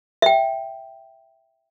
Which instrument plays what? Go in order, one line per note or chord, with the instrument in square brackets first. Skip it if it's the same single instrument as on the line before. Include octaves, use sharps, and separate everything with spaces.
[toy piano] E5 G5